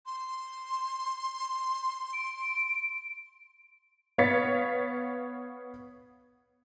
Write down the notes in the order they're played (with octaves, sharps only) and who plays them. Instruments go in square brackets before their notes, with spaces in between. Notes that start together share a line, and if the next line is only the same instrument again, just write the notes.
[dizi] C6
[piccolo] D7
[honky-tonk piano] B3 C#5 F5 A6 B6 C#7